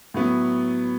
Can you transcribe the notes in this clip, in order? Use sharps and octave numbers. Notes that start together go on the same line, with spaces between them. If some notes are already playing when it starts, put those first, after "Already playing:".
A2 F#3 B3